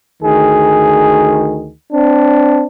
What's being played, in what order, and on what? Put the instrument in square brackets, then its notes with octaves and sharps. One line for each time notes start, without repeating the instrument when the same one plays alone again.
[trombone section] D2 D#3 G#4
C4 D4